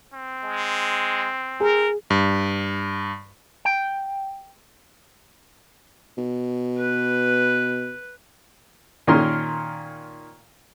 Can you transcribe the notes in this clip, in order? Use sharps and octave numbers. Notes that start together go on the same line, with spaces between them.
C4
G#3
G#4 A#4
G2
G5
B2
B4
A#2 D#3 C#4 A#4 C6